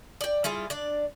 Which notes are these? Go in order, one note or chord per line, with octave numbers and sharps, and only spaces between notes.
D5 G5
G3 E4 F4 G#4
D4 D5